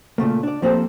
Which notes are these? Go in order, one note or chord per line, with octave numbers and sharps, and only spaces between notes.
A#2 C#3 A3 A#3
D4 D5
F3 A#3 C4 G4 A4